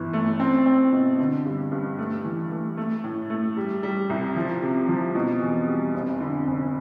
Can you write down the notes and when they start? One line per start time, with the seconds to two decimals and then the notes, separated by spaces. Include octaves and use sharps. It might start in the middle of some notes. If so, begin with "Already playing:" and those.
Already playing: G1 E3
0.13 A3
0.40 C4
0.66 C4
0.92 B2
1.19 D3
1.45 G2
1.71 G2
1.98 A3
2.24 E3
2.51 A3
2.77 A3
3.04 A2
3.30 A3
3.57 G3
3.83 G3
4.09 C2
4.36 F3
4.62 C3
4.89 F3
5.15 B2
5.41 E2
5.67 G3
5.94 F1
6.20 D3
6.47 F1